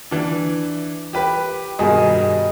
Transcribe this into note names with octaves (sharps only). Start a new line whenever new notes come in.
E3 D4
G4 B4
G2 B2 D#3 G#4 D#5